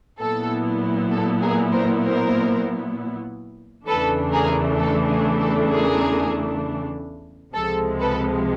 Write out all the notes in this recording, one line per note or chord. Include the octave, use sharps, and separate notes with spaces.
A#2 F#3 B3 E4 A4
A4
G#4 A#4
A#4 C5
A#4 C5
E2 C#3 E3 A3 D4 A4 B4
G#4 A#4
A4
G#4
A4
G#4 A#4
C#2 C3 F3 G#3 A4
A4 B4